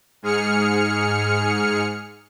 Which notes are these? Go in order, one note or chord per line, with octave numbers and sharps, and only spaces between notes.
G#2 G#4 F6 C#7